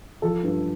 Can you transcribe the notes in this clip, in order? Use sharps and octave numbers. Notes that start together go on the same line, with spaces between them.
F3 A4
G2